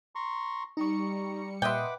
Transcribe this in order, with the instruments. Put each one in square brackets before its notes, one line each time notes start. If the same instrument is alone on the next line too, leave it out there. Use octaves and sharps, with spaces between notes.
[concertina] A#5 C6 C#6
[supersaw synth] G3 C#7 [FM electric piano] D#4 C#6 [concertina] A#5
[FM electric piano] A#2 D#5 C6 [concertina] B4 F#5 D6 [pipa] E5 G5